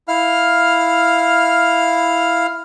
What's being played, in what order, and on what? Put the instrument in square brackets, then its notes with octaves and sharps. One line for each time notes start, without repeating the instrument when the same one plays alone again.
[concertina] E4 F5 F6